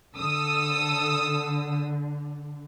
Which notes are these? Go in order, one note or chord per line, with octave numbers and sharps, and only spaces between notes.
D3 A4 D#6 E6